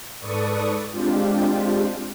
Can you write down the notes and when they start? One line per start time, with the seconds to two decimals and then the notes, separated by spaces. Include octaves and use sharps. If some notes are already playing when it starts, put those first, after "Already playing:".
0.20 G#2 A4 B4 D5 C#6 D#6
0.90 G#3 C4 D4 F4 G4